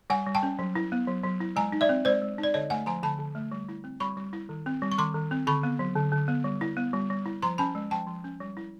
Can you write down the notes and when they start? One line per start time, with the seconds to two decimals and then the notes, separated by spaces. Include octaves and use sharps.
0.10 G3 F#5 G#5
0.26 G3
0.35 G5 A5
0.43 C#4
0.59 F#3
0.75 E4
0.92 B3
1.08 F#3
1.24 F#3
1.40 E4
1.56 G#3 G#5 A#5
1.72 D#4
1.81 D5 E5
1.89 C4
2.05 G#3 C5 D5
2.22 G#3
2.38 D#4
2.43 D5
2.54 D3 C#5 D#5
2.70 A3 F#5 G#5
2.86 F3 G#5 A#5
3.03 D3 A5 B5
3.19 D3
3.35 A3
3.52 G3
3.69 E4
3.84 C4
4.00 G3 B5 C#6
4.17 G3
4.33 E4
4.49 D#3
4.66 C4
4.82 G3
4.92 C#6
4.98 D#3 C6 D6
5.14 D#3
5.31 C4
5.47 D3 B5 C#6
5.63 B3
5.79 F#3
5.96 D3
6.12 D3
6.28 B3
6.44 G3
6.61 E4
6.77 B3
6.93 G3
7.10 G3
7.26 E4
7.42 F3 A#5 C6
7.58 C#4 A5 B5
7.75 G#3
7.91 F3 G5 A5
8.07 F3
8.24 C#4
8.40 G3
8.57 E4